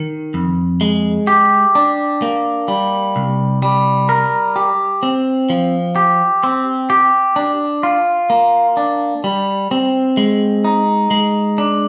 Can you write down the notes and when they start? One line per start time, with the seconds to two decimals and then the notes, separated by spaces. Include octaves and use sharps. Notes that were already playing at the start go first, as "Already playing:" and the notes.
Already playing: D#3
0.34 F2
0.81 G#3
1.27 G4
1.75 D4
2.22 A#3
2.68 G3
3.16 C2
3.62 G3
4.09 A#4
4.56 G4
5.03 C4
5.50 F3
5.96 G4
6.43 C4
6.90 G4
7.36 D4
7.83 F4
8.30 A#3
8.77 D4
9.24 G3
9.71 C4
10.17 G#3
10.65 D#4
11.11 G#3
11.58 D4